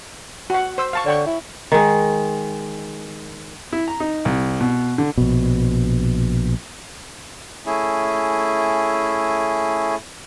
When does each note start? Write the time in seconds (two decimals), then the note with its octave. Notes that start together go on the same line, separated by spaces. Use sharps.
0.50 F#4 F#5
0.78 C5 E6
0.93 F5 A5 C#6
1.06 D3 C#5 G5 C#6
1.27 E4
1.72 D#3 G#3
3.73 E4
3.88 A#5
4.00 D#4
4.25 C2
4.61 B2
4.98 D3
5.18 A#1 B2
7.66 A3 C#4 E4 G#4